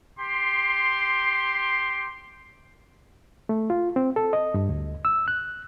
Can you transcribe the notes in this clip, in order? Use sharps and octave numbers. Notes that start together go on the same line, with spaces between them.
G4 C6
A3
F4
C4
A4
D#5
G2
D2
E6
F#6